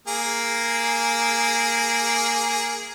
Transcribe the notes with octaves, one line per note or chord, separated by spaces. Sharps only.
A#3 G#4